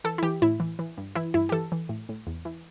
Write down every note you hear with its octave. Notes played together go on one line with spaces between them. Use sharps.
E3 A4
E4
E3 G4
A2 E4
E3
E3
G2
E3 E4
G2 E4
G4
E3 A4
E3
A2
A2
E2
E3